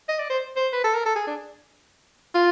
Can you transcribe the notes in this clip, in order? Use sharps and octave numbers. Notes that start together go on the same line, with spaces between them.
D#5
D5
C5
C5
B4
A4
A#4
A4
G#4
D4
F4